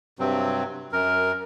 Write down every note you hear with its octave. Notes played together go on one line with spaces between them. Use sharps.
G2 C3 F#3 C4
F#2 A#4